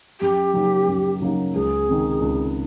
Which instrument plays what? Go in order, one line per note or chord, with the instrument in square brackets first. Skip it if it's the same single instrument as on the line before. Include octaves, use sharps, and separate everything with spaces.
[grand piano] F#2 [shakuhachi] G4
[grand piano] C#3 F#3 A#3 D#4
F#2
C#3 F#3 A#3 D#4
[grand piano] C#2 [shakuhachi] G#4
[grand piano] C3 D#3
C#2